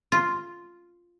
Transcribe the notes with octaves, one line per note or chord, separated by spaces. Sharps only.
F4